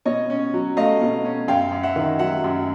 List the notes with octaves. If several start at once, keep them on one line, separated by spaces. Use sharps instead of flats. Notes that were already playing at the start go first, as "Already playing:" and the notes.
B2 C#5 D#5
C#4
F#3
A3 D#5 F5
B2
C#4
F#2 F5 G5
F#2
E5 F#5
D#3
F#3 E5 F#5
F#2